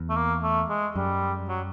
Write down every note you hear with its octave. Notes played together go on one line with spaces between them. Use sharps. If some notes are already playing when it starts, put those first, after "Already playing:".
Already playing: E2
A3
A#3
A3
G#3
F#2 G3
F#3